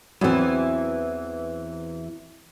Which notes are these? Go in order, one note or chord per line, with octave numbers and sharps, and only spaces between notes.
E2 E3 F#3 C4